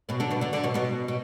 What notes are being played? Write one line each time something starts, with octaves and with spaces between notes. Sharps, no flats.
B2 B3
D3 D4
B2 B3
D3 D4
D3 D4
B2 B3
B2 B3
B2